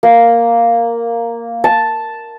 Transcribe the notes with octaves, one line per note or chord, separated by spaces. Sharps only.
A#3
A5